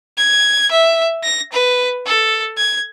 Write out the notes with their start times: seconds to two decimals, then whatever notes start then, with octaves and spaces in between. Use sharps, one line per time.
0.18 G#6
0.71 E5
1.24 A#6
1.52 B4
2.06 A4
2.57 G#6